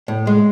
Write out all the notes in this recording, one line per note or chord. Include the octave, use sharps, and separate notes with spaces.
A2
G#3